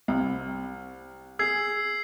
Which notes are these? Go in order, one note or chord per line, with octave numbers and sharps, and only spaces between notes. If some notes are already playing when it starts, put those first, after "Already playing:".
C2
G#4 E6 G#6 C7